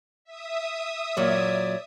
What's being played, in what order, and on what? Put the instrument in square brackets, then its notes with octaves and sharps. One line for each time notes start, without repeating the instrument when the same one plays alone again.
[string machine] E5 D#6
[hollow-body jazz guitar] A#2 F#3 A#3 [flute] C#5 [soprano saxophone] D5